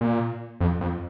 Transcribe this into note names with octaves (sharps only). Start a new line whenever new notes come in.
A#2
F2
F2